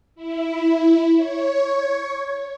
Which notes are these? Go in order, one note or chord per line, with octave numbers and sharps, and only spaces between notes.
E4
C#5